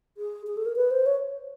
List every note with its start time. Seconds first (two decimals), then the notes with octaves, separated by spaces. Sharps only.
0.17 G#4
0.47 G#4
0.57 A4
0.66 A#4
0.76 B4
0.91 C5
1.06 C#5